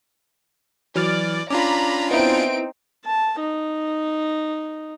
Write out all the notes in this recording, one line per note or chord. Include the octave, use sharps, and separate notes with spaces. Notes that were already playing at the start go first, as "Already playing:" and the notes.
E3 F#3 D5 F6 A6
C#4 D4 F4 A#5 B5 D6
B3 C4 D#4 E4 D7
A5
D#4